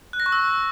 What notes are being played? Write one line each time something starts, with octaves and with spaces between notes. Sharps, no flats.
F#6
A#6
C#6
E6